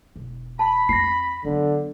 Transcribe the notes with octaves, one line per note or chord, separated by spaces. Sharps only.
E1
A5 B5
F2 F4 A#6 C7
D3 F#3 B3